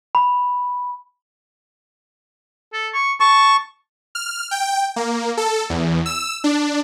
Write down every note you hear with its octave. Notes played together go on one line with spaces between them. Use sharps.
B5
A4
C#6
A5 C#6
F6
G5
A#3
A4
E2
E6
D4